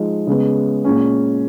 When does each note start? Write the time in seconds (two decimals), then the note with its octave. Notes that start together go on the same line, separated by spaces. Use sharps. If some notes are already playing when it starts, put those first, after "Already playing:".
Already playing: F3 G#3 D#4
0.27 C#3 G#3 B3
0.85 A#2 G#3 C#4